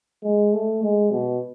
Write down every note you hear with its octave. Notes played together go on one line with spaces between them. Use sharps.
G#3
A3
G#3
B2